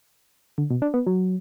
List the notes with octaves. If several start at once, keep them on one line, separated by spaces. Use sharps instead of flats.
D3
B2
D4
B3
F#3